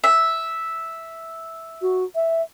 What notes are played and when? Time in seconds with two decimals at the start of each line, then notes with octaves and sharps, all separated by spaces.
0.04 E5
1.82 F#4
2.15 E5